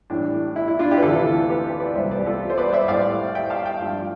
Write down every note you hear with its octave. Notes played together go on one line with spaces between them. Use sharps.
A2 E3 G3 D4
E4
E4
D4 F4
E4 G4
B4
D2 C3 E3 F4 A4
G4 B4
B4 D5
C2 C3 G3 C5 E5
B4 D5
G4
F4 A4
C5
B4 D5
C5 E5
A2 G3 D5 F5
E5 G5
F5 A5
E5 G5
G2 F3 A3